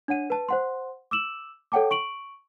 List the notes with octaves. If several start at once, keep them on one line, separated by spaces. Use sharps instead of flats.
D4 C#5 F#5 D#7
B4 A5
C5 F#5 C6
D6 E6 E7 F#7
A4 C#5 F#5 G5 A5 D6
C#6 D7 F#7